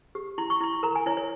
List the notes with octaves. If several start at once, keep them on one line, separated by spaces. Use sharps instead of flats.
G4
E4 C6
C#6
E4 C6
A#4 A#5
G#5
E4 C#5
C#5